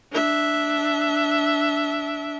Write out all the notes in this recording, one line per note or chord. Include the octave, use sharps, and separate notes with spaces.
D4 E5